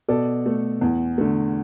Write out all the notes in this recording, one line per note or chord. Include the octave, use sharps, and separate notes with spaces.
B2 A4 D5
A3
E2
D3 A3